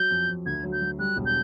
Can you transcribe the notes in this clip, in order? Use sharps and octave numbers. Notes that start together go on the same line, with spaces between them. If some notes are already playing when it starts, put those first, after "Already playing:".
Already playing: F#3 G6
F2
F2
D2 G#6
F#3
G6
F#3
G3 F#6
E1
G6